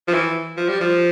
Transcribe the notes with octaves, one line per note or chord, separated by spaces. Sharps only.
F3
E3
F3
G3
F3